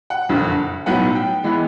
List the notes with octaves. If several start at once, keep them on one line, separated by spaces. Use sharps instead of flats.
F#5
F#1 F2 D3
B1 A2 F#3 B3 F#5
G5
E3 G#3 B3